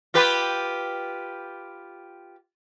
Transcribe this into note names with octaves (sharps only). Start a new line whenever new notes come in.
F4 G4 B4